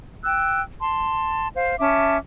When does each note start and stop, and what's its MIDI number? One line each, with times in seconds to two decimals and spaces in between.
0.23 0.61 79
0.23 0.61 88
0.23 0.61 90
0.80 1.47 81
0.80 1.47 84
1.55 1.75 72
1.55 1.75 77
1.79 2.17 61
1.79 2.17 76
1.79 2.17 81
1.79 2.17 86